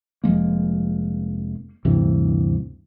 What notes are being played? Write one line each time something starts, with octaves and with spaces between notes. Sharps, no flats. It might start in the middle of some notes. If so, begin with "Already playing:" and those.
F1 F3 G#3 A#3
D2 G2 C3 E3